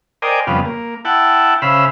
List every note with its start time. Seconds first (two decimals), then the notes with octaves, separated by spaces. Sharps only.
0.22 A#4 C5 D5 D#5 G5 G#5
0.47 F2 C#3 G3 B3 F5
0.64 A#3
1.05 E4 F#5 G5 A5
1.62 C#3 C5 E5 F5 B5